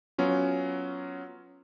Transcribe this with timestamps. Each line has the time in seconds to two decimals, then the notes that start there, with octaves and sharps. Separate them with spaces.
0.18 F#3 B3 C#4 F4